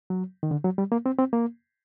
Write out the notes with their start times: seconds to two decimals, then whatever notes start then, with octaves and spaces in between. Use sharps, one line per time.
0.10 F#3
0.43 D#3
0.51 D3
0.64 F#3
0.78 G3
0.92 A#3
1.06 C4
1.19 C4
1.33 A#3